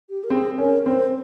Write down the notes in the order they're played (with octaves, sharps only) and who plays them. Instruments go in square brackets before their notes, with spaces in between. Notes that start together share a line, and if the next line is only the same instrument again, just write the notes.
[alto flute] G4
A#4
[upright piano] C4 [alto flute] G#4
[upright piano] C#4 [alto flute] A#4
[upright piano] C4 [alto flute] C5